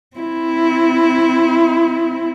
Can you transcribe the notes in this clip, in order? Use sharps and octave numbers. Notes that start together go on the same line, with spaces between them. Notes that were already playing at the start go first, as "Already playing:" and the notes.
C4 E4